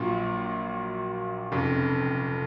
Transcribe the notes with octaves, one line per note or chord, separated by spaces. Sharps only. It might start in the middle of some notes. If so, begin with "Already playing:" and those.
Already playing: A#1 A#2 F#3 A#3 F4
F1 F2 C#3